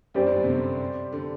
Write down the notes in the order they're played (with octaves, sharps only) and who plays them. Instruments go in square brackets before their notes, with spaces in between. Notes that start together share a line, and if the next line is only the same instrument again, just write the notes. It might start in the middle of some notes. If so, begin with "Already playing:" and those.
[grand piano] F#2 [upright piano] G3 C4 G4 D5
[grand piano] G2
F#2
C3
D3
D3